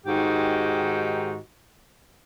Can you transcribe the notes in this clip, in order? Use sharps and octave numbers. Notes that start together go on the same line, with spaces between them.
G#2 D#3 D#4 F#4 G4